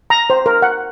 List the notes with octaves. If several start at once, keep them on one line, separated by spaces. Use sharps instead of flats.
A#5
C5
A#4
F#5